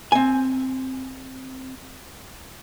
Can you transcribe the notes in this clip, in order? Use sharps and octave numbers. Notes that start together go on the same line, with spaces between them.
C4 G#5